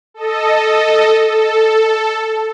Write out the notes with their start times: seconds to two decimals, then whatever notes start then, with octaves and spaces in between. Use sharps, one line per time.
0.14 A4 D#5
1.28 A4